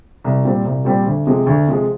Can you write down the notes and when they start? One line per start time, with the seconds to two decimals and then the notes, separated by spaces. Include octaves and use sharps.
0.24 C2
0.45 A#2 G3 C4
0.65 C2
0.85 A#2 G3 C4
1.06 D2
1.26 C3 F3 G#3
1.47 D2
1.67 C3 F3 G#3